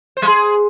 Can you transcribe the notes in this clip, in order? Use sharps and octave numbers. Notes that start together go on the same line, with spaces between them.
C5
G3
G#4